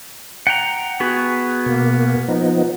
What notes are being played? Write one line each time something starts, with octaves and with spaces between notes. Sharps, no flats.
F#5 G5 A#5
B3 F#4 G#4
B2 A#3
F3 B3 D#4